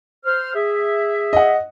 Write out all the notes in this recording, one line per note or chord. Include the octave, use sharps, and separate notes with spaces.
C5 F6
G#4 E5
D#5 F#5